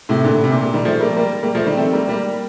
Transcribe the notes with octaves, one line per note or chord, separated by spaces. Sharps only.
A2 C3
A#2 D3
C3
A#2
A#2
D#3 G3
F3 A3
G3 A#3
G3 A#3
G3 A#3
F3 A3
D#3 G3
A3 C4
G3 A#3
G3 A#3